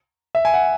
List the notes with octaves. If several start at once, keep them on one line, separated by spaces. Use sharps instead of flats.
E5
G#5
F#5